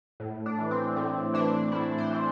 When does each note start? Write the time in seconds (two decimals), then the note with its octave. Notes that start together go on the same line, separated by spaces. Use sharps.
0.20 A2
0.46 D4
0.59 E3
0.71 C4
0.96 A2 C4
1.34 E3 D4
1.72 A2 E4
1.98 C5
2.10 E3